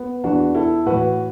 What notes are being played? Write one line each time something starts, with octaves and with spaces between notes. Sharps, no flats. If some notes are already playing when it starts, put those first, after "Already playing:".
Already playing: B3
E2 E3 D4 F#4
E4 A4
A2 E3 F#4 B4